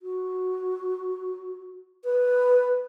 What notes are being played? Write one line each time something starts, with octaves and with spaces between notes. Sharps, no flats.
F#4
B4